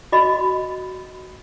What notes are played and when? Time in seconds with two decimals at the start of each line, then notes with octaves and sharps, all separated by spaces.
0.12 F#4 D#5 B5